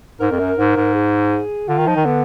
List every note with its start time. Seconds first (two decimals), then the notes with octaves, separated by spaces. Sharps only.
0.20 G#2 A#4
0.31 F2
0.39 F#2
0.58 G#2
0.76 G#2
0.95 G#4
1.69 D3 F4
1.78 D#3
1.87 F3 D#4
1.96 D#3
2.05 D3 B3